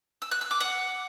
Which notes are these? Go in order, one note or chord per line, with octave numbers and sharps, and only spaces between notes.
E6
F#6
E6
D6
F#5